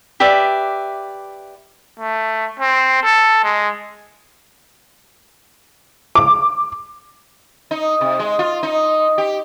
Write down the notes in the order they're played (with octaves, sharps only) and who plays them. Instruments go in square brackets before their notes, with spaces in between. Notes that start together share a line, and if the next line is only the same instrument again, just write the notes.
[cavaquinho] G4 B4 D5 E5
[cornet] A3
C4
A4
G#3
[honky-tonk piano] D6
[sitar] D#4
C3
G#3
F4
D#4
G4